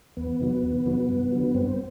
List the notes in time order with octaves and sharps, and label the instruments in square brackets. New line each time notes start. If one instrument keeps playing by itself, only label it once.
[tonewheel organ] E2 B3
C3 D#3 F#3
E2
C3 D#3 F#3
G2
D3 F#3
G2 C4